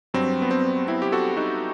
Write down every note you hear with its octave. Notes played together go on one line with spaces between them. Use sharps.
G2 F#3 C4
B3
C4
C4 E4
G4
F#4 A4
D#4 F#4